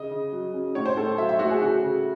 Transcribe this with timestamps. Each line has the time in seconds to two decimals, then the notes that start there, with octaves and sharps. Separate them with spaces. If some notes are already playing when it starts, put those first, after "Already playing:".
Already playing: C#3 D#5
0.11 C#3
0.33 F#3
0.54 C#4
0.75 A2 C#5
0.86 C5
0.97 A2 A4
1.18 F#3 E5
1.29 E5
1.39 A3 F#4
1.50 G#4
1.61 C#3 F#4
1.82 C#3